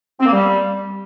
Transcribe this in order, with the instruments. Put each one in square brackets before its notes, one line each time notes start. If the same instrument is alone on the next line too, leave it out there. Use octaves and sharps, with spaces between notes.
[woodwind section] C4
A#3
G3